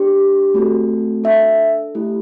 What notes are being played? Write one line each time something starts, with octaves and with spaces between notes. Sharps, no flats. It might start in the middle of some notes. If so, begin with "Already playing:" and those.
Already playing: D4 G4
A3 C4 F#4 A4
D4 A4 E5
A3 E4 G4